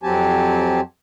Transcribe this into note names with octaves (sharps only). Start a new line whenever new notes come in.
F2 F#3 C4 G4 G#5 A5